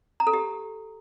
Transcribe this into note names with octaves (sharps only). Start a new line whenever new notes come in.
A#5
A4
G4